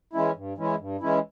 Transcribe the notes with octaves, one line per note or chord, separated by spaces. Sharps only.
E3 G#3 C#4 E4
G2
E3 G#3 C#4 E4
G2
E3 G#3 C#4 E4